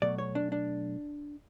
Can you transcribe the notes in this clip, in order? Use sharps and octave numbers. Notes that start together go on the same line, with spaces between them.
B2 F#3 A3 D5
C#5
D4
D4